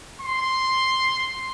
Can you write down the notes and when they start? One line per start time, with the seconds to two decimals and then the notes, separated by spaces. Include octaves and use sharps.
0.21 C6